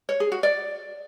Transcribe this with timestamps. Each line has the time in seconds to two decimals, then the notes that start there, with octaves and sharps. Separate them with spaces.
0.09 C#5
0.20 G#4
0.32 F#4
0.43 D5